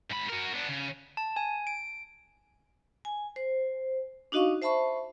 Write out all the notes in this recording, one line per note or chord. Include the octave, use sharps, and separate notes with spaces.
G#2 B5
F#4 A#4
B3 D4
C#3
A5
G#5
D7
G#5
C5
D4 D#4 F#4 D#5 F5 C#6
C5 E5 A5 B5 C#6